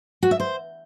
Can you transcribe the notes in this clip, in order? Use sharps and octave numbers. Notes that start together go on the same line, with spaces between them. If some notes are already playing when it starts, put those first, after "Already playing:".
F#4
E5
C5